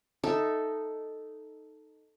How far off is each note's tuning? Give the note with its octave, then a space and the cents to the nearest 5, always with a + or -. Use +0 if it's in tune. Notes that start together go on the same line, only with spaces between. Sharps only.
D#4 -5 A4 +0 E5 +0